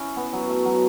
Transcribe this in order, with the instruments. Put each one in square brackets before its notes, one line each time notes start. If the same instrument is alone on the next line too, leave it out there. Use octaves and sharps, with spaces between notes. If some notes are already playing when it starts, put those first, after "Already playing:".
Already playing: [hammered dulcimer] C#4 E4
B3
F#3
A3
F#3